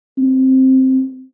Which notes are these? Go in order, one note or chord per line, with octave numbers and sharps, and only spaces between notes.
C4